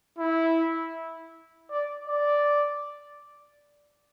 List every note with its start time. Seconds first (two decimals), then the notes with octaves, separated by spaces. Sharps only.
0.18 E4
1.71 D5
2.08 D5